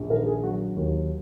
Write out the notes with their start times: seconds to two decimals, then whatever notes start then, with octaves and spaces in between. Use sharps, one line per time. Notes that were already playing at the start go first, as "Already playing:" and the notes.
Already playing: A#1
0.10 D#3 A#4
0.26 G#4
0.43 F#3 F#4
0.76 D#2